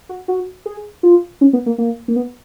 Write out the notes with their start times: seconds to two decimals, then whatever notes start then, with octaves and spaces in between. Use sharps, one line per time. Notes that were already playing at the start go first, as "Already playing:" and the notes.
0.09 F#4
0.28 F#4
0.66 G#4
1.03 F4
1.41 C#4
1.53 B3
1.66 A#3
1.78 A#3
2.08 A#3
2.16 B3